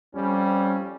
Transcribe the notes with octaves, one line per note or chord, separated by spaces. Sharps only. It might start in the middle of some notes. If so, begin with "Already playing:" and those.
F2 G3 C#4